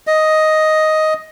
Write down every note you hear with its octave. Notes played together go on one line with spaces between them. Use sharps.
D#5